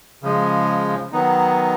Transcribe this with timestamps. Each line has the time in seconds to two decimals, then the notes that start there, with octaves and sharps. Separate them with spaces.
0.23 C#3 F3 G#3
1.12 D#3 F#3 B3 D#4